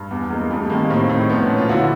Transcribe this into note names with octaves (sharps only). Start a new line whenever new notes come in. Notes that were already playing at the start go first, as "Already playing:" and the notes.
Already playing: G2
E2
E2 G#3 A#3
F2 G3 A3
D#3 G#3 A#3
A2 A#3 C4
A2
F3 B3 C#4
A#2
F4
D3 E4 F#4